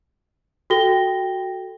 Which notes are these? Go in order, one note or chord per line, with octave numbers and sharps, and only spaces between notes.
F#4 A4 G5 A#6 G7